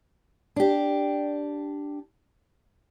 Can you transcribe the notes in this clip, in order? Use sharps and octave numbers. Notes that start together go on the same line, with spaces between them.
D4 G4